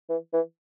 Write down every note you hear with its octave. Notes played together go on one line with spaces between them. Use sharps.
E3
E3